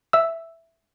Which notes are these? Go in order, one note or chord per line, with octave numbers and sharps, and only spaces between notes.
E5 E6